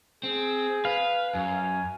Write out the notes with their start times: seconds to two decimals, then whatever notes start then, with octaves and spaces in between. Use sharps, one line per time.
0.23 C4 G#4
0.85 B4 F5
1.35 F#2 G#5